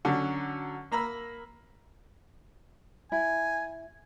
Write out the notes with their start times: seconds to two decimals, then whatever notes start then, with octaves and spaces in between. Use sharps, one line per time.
0.05 D3 F#3 C#4
0.92 A#3 A#5 B5 E6
3.12 E4 G#5